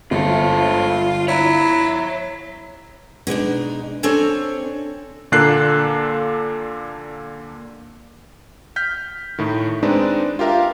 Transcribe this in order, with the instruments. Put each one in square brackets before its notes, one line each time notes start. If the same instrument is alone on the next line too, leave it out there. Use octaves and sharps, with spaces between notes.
[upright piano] G1 [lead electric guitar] G#2 A4 [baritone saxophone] F4
[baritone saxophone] E4 [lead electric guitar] C#5 A#5
[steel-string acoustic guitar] B2 G#3 D4 D#4
C4 D4 A4 C#5 G#5
[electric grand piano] A#2 D3 A#3 A4 F#6 C7
F6 G6 B6
A2 D#3
G#3 C4 D4 D#4 B4
F4 G4 A#4 E5 F5